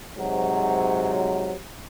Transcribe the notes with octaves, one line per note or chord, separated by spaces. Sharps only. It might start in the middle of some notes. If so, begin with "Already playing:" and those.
G#2 C3 F#3